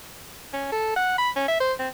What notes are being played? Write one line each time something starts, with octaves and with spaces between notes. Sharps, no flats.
C#4
A4
F#5
B5
C#4
E5
C5
C4